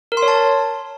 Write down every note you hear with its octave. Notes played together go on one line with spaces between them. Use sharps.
A#4
C6
C#5
A5